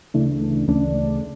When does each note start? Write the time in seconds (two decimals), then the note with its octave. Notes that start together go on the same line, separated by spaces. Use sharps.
0.14 D2 C#3 E3 A3 D4
0.68 D2 C#3 E3 A3 D4